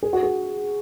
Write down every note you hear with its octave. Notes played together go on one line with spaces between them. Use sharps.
G#4
F#4
G#4